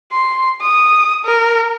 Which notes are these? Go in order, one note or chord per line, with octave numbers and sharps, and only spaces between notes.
C6
D#6
A#4